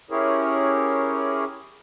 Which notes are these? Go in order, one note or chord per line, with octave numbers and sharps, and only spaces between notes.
C#4 E4 G4 G#4 A#4 C#5